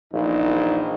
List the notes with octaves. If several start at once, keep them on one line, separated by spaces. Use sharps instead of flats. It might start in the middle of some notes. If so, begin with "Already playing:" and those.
A#1 E2 D#4